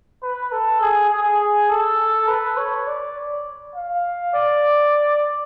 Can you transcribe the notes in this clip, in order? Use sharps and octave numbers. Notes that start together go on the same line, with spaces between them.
B4
A4
G#4
G#4
A4
B4
C#5
D5
F5
D5